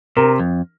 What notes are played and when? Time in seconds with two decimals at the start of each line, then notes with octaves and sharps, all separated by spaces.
0.17 C3 A#4
0.40 F2